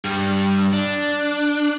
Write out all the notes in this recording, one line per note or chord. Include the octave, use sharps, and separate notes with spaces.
G2 G3
D4